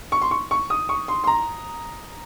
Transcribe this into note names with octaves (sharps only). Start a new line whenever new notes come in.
C#6
C6
C#6
C#6
D#6
C#6
C6
C6
A#5